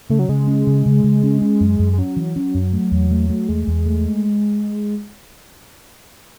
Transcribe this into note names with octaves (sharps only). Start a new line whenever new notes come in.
C#3 A3
F#3
C#3 G#3
C#4
C#3
C#3
C#3
C#4
C#4
F#2
F#2
G#3
F#3 C#4
E3
C#4
F#2
A3
E2
A3
A3
E2 G#3
E2
A3